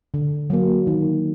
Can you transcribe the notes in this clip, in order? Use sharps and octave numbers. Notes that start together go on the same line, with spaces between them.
D3
F#3 A#3
D#3